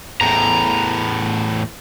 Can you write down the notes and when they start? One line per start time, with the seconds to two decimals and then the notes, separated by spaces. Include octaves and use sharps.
0.21 E2 A2 A#5